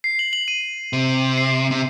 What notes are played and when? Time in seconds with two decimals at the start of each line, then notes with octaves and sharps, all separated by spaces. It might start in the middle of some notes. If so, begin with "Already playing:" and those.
0.04 C7
0.19 F#7
0.33 F#7
0.48 D#7
0.93 C3
1.37 C7
1.71 C3